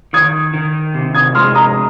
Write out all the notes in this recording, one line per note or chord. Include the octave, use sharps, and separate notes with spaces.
D#3 D#6 G#6
D#3
C3
D#6 G#6
G#3 C6 F6
A#5 D#6